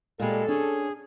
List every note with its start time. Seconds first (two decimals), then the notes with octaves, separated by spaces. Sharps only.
0.20 A#2 G3 G#3 A4
0.48 C#4 D4 G#4